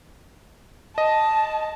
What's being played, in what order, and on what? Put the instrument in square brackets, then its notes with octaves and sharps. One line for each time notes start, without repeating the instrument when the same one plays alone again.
[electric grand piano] D#5 [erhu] A5